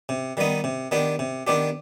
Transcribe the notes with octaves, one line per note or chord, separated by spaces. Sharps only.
C3
D#3 G3 B3 D#4
C3
D#3 B3 D4 G4
C3
D#3 B3 D4 G4